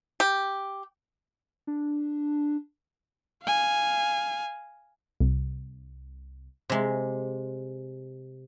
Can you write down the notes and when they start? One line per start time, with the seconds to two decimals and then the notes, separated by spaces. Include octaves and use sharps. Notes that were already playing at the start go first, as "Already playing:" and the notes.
0.20 G4
1.67 D4
3.43 F5 G#5
5.20 C2
6.69 C3 G#3